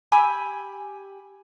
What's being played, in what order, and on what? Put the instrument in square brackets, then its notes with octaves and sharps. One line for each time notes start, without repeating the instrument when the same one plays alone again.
[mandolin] G4 G#5 B5 E6